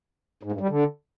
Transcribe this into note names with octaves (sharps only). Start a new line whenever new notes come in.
G#2
G2
G3
D3